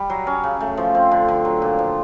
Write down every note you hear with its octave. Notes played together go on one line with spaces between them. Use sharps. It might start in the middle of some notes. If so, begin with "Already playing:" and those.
Already playing: G3
F#3
C#4
C#3
A3
F3
C4
D3
D3
F#3
A#2
F3